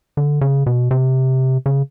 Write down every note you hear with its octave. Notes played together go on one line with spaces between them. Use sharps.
D3
C#3
B2
C3
C#3